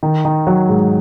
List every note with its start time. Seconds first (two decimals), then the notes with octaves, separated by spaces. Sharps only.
0.03 D#3
0.25 D#3
0.47 F#3
0.69 G#2